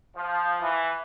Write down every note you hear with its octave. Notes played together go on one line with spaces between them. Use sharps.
F3
E3